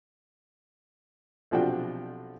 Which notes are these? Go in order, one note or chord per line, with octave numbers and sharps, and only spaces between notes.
B1 C3 F3 D4 F#4 G5